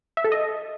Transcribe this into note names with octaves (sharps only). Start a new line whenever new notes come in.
E5
A4
D#5